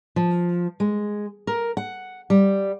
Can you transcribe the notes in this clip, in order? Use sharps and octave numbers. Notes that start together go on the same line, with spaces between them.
F3
G#3
A#4
F#5
G3